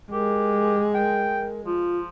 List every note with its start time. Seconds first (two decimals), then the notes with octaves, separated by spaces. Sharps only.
0.12 G#3 G4 A#4
0.95 A#4 G5
1.65 F3 F4